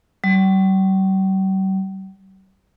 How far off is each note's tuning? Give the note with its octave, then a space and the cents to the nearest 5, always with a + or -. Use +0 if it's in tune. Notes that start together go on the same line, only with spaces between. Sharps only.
G3 -45